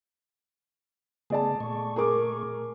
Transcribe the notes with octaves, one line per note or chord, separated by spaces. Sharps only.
C#3 A3 B3 G#4 D5 A5
A#2 A3 C#6
G#4 A#4 D6